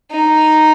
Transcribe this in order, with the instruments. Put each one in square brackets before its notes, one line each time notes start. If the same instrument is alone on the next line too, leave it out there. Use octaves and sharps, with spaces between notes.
[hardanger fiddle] D#4